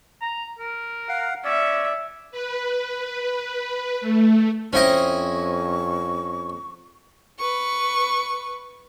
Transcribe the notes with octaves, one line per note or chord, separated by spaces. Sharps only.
A#5
A#4
F5 F#5
C#4 D5 E5
B4
A3
F2 C#4 E4 C5 D#5 G5 C#6
B4 C#6